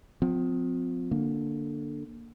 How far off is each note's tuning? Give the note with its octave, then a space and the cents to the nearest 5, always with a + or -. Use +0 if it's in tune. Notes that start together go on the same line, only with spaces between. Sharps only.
F3 +30 C4 -30
D3 +0 A#3 +0